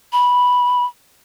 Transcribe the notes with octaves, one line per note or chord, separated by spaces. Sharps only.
B5